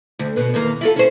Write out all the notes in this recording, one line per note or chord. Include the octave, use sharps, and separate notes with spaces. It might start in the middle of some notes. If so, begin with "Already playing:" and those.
D2
B2 B3
E2 D#3 A#3
E4 F4 A4
C#4 E4 C5